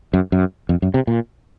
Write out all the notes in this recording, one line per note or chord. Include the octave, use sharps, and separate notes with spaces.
F#2
F#2
F2
F#2
C3
A#2